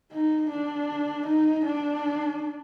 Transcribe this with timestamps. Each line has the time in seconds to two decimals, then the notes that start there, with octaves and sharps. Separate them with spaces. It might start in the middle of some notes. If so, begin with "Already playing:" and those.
0.13 D#4
0.50 D4
1.27 D#4
1.65 D4